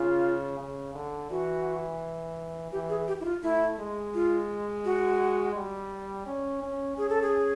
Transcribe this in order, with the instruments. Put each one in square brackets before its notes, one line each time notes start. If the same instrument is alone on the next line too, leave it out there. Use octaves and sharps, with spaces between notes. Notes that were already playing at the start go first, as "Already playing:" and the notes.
Already playing: [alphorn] C#3 [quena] F4
[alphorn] C#3
D3
[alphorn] E3 [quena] F#4
[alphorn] E3 [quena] G4
[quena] G#4
G4
E4
F4
[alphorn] A3 [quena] E4
[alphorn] G#3
[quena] F4
F#4
[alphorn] G3
C#4
C#4
[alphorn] C#4 [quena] G#4
[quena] A4
G#4